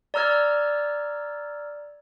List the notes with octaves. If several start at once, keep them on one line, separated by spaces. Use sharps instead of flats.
D5 A#5 E6 F6 G#6